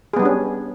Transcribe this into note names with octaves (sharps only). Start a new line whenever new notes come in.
G3 B3 C#4 D4 G#4